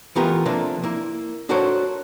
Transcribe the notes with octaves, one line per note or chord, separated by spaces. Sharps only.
E3 A3 B3 F4 G4 A#4
C3 F3 A#3 D4 A4
A#3 E4
D4 F#4 A4 A#4 C5 C#5